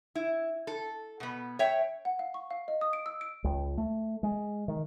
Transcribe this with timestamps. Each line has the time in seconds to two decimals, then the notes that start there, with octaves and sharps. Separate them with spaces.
0.15 E4
0.67 A4
1.20 B2 B3
1.59 C#5 E5 G5
2.05 F#5
2.19 F5
2.34 C#6
2.51 F5
2.68 D#5
2.81 D#6
2.93 D7
3.06 E6
3.21 D7
3.44 C#2
3.78 A3
4.23 G#3
4.68 D#3